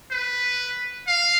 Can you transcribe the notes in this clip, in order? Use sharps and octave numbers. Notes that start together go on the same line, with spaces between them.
B4
F5